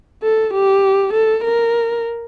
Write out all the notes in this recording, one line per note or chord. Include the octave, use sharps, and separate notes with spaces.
A4
G4
A4
A#4